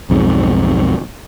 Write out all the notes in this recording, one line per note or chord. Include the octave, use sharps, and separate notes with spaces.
B1 F2 G#2